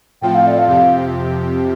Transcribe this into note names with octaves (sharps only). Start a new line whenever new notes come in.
A2 F3 C4 F4 A4 G5
F5
D5
F5
F2 C3 F3 C4 G4